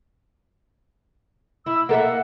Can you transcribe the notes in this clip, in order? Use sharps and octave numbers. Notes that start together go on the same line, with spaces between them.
E4 E6
A#3 A4 E5 F#5